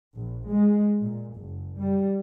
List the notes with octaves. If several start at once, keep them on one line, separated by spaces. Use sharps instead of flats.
A#1
G#3
A#2
F#1
G3